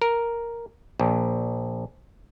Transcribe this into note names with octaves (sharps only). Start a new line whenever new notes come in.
A#4
A#1